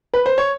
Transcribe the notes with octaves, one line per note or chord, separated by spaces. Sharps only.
B4
C5
C#5